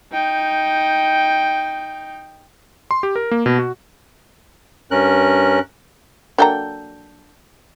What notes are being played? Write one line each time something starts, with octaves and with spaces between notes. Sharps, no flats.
D#4 G5
C6
G4
A#4
A#3
B2
F#4
G2 C#4 A#4 F#6
F#3 A#3 D4 A4 G5 A#5